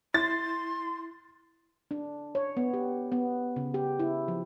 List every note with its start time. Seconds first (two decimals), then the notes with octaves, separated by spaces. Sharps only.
0.14 E4 C6 A6
1.91 D4
2.35 C#5
2.57 B3
2.74 G4
3.12 B3
3.56 C#3
3.74 G4
3.99 E4
4.28 F3